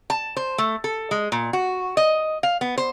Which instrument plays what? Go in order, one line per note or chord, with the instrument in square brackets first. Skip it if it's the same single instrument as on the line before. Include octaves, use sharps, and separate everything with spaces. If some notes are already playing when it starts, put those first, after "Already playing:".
[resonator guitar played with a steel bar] A5
C5
A3
A4
G#3
A#2
F#4
D#5
F5
B3
C5